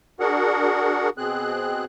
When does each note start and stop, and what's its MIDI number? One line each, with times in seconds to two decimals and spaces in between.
0.20 1.10 62
0.20 1.10 66
0.20 1.10 68
0.20 1.10 70
0.20 1.10 78
1.18 1.85 47
1.18 1.85 60
1.18 1.85 68
1.18 1.85 90